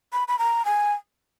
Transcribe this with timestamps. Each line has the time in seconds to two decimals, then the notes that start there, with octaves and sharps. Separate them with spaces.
0.13 B5
0.28 B5
0.39 A#5
0.65 G#5